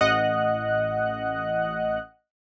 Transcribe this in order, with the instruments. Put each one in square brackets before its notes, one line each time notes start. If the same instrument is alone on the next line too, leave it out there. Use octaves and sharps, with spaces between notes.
[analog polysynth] A1 D#5 F#5 F#6